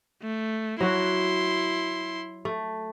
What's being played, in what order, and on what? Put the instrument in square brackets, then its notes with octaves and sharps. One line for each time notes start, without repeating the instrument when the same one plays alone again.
[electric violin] A3
[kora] F#3 F#4 [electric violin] E4 C6
[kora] A3